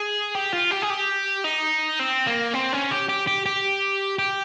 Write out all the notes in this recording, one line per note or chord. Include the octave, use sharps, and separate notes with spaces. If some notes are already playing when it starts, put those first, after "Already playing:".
Already playing: G#4
G4
F4
G4
G#4
G4
D#4
C4
A#3
C4
C#4
G4
G4
G4
G4
G4